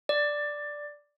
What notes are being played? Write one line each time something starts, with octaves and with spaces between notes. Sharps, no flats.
D5